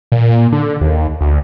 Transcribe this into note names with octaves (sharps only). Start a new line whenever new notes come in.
A#2
D3
D#2
D2